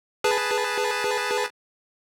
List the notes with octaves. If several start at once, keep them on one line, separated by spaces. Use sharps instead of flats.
G#4 B4 A5